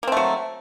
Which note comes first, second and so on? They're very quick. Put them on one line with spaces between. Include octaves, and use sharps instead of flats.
A#3 C4 A3 F#3